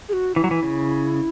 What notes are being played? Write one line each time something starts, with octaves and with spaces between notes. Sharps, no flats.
G#4
F#4
E3 E4
F#3
E3
C#3